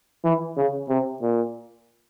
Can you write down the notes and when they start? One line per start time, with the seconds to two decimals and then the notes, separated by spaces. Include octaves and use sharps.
0.24 E3
0.57 C#3
0.89 C3
1.21 A#2